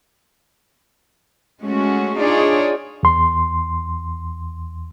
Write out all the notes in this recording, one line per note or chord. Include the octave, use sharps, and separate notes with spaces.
G#3 A3 C#4 F#4
D4 D#4 F4 G#4 C#5 D5
E2 C6